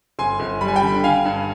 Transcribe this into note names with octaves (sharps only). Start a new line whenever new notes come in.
G1 G#5 C6
G1
G3 B5
G#5
G5 B5
D3
D3 F5 G#5
G2